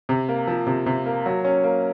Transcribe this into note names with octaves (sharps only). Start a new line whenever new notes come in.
C3
A#3
F3
C3
C3
A#3
F#3
C#4
A#3